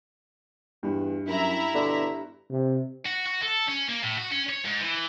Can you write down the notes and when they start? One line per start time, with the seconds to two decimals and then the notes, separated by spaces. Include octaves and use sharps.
0.83 E2 G2
1.28 F#2 E4 E5 A#5
1.75 B2 D3
2.51 C3
3.06 F#4
3.27 F#4
3.43 A4
3.68 C#4
3.89 A#3
4.03 A2
4.18 F#4
4.32 C#4
4.50 C#5
4.65 G#2
4.81 E3